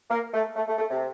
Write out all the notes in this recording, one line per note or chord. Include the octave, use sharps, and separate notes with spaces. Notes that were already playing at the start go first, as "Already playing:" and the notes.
A#3
A3
A3
A3
A3
C3